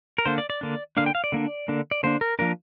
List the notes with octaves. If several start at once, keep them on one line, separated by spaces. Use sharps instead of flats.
A#4
D3 A#3 D4 C5
D5
D5
D3 A#3 D4
D3 A#3 D4 F5
G5
F5
D5
D3 A#3 D4
D3 A#3 D4
D5
D3 A#3 D4 C5
A#4
F3 A#3 D4 A#4